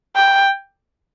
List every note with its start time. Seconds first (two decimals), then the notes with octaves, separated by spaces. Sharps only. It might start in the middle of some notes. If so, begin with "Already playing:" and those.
0.16 G5